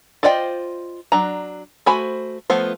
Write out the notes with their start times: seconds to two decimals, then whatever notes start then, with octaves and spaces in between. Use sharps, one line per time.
0.23 F4 C5 D5 D#5 G5
1.12 F#3 D4 A#5
1.86 A3 F#4 C5 G#5 B5
2.50 F3 A3 B3 F4 C5